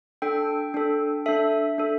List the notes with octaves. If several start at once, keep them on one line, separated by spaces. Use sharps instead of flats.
D4 A4 G5
D4 A4
D4 A4 E5
D4 A4